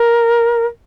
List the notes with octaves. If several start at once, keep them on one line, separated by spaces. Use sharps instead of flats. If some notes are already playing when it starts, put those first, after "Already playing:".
Already playing: A#4